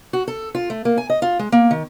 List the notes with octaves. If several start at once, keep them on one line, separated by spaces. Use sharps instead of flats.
F#4
A4
F4
A3
A#3
G#5
D#5
F4
G#3
A#3
D#3